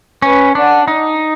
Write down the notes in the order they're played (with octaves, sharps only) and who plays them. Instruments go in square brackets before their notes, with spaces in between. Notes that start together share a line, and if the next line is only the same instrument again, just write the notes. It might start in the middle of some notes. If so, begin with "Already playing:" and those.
[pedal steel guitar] C#4 [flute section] B4
[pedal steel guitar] D4 [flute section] D5 F#5
[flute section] D4 [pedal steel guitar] D#4